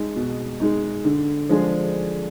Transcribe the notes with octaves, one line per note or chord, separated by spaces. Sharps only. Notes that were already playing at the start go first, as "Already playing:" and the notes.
Already playing: G#3 D#4
B2
G#3 D#4
D3
F3 G#3 D4 G#4